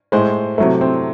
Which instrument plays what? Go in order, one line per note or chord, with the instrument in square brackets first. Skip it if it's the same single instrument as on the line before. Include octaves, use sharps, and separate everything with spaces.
[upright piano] A2 G#3 C5
C3 F#3 A3 E4
C4